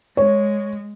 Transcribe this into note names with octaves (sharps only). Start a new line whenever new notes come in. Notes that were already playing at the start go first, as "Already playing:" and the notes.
G#3 C#5